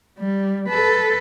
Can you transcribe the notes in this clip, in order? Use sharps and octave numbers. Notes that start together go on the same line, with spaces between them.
G3
A4 B4